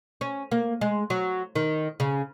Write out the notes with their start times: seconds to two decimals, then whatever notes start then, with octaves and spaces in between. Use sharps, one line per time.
0.21 C#4
0.52 A#3
0.81 G#3
1.10 F#3
1.55 D#3
2.00 C#3